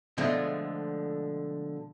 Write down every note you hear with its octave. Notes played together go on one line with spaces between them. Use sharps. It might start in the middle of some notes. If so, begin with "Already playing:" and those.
B2 D3 F3 G#3 A3